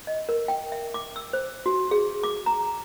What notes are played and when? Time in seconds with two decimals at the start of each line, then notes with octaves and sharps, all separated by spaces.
0.07 D#5
0.29 A#4
0.48 G5
0.72 E5
0.94 D6
1.16 E6
1.33 C5
1.66 F#4
1.91 G#4
2.23 D6
2.46 A#5